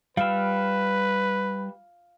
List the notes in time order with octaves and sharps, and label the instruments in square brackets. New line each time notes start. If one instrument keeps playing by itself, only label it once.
[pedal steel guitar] G3 E5 [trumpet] B4 [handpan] F5